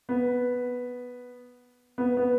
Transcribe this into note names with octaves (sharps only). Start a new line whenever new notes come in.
B3
B3
B3